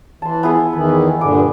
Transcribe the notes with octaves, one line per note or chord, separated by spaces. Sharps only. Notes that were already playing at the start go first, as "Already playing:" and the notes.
E3 A5 C6
B3 E4 G#4
E2 D#3 E3 B4
G2 A#2 D3 D6